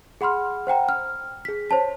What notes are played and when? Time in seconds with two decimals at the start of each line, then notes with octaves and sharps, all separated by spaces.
0.21 G#4 F#5 B5 C6 F6
0.67 C5 F#5 G5 A#5
0.89 F6
1.45 G#4 B6
1.70 C5 C#5 A5 B6